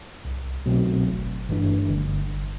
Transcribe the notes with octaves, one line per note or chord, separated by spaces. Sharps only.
C2
B2 F#3 A3 C4
G1
G2 E3 A3 D4
G1